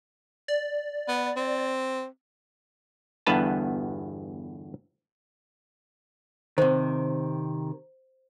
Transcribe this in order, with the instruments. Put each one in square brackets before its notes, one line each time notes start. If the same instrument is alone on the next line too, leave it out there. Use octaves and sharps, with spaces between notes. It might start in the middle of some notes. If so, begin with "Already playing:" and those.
[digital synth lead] D5
[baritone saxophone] B3
C4
[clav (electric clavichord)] G1 E2 G2 B3 B4 A5
[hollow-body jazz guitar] C3 D#3 [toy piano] C5